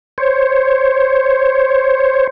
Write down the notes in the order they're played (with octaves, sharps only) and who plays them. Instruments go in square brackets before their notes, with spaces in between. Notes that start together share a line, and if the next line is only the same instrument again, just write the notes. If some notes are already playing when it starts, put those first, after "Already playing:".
[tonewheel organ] C5 C#5